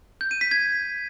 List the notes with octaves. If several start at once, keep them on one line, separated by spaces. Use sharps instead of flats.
G6
D#7
B6
G#6